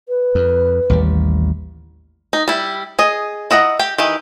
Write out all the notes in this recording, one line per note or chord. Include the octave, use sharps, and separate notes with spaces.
B4
F2
A1 D#2 G3
D#4
G3 E4
G#4 D#5
E4 D#5 F#5 A#5
G4 G5
D#3 E3 G4